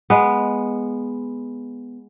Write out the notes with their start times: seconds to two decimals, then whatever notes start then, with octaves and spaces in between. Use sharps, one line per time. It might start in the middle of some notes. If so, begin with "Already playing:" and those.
0.10 G#3 B3